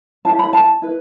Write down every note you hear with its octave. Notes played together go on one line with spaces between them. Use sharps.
C#4 E4 G4 A5
B5
A5
E4 B4